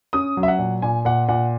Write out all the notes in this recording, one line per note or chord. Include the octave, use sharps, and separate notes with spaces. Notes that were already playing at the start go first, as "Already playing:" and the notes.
C#4 D#6
F#3
E5
F#5
A#2
A#2 G#5
A#2 F#5
A#2 F#5